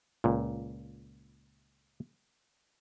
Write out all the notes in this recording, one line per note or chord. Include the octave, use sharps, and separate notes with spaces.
C#2 A#2